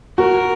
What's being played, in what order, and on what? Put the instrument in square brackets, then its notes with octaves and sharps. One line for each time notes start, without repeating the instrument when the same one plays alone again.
[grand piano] F#4 [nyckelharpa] A#4